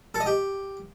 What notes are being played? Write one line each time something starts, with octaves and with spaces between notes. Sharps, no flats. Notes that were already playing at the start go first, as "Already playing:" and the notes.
A4
D#5
G4